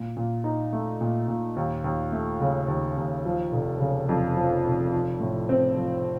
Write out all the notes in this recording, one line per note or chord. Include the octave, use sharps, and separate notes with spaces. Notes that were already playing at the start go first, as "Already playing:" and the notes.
Already playing: A#2
A#2
D#4
A3
A#2
A#2
D#2
D#2
A3
C#3
D#2
D#2
F3
F1
C#3
F2
F3
F1
F4
A2
C4
F3